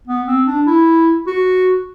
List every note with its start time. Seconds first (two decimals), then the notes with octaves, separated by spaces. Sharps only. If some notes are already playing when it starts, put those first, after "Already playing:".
0.07 B3
0.27 C4
0.47 D4
0.67 E4
1.27 F#4